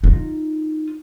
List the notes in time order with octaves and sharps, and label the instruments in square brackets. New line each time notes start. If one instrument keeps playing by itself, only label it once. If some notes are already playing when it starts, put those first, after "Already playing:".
[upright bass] D#4 F4